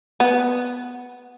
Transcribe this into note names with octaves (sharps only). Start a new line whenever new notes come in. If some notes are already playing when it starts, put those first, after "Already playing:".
B3